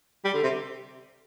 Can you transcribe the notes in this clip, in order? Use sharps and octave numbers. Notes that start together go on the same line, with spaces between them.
G3
D3
C3